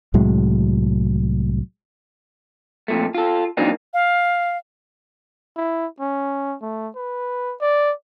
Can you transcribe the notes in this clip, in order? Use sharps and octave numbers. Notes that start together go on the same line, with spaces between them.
C2 A2 F#3 G#3
F2 A#2 A3
F4 A4
E3 F#3 A#3 C4 D4 D#4
F5
E4
C#4
A3
B4
D5